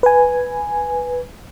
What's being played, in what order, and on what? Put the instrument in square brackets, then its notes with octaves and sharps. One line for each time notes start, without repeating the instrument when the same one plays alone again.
[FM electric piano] B4 G#5